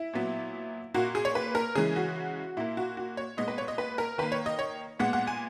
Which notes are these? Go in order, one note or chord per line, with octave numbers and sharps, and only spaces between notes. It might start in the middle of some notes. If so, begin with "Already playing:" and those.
Already playing: E4
A#2 F#3 B3
A#2 A#3 F#4
G#4
C#5
B4
A#4
C#3 E3 G#3 G#4
F#4
A#2 A#3 E4
F#4
F#4
C#5
A#2 G#3 B3 D#5
B4
C#5
D#5
B4
A#4
D#3 A#3 B4
C#5
D#5
C#5
A#2 G#3 B3 F#5
F#5
G#5